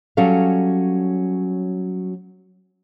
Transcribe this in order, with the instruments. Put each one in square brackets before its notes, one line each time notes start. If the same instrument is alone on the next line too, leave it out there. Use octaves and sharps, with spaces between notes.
[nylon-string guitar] F#3 G3 C#4 A4 F5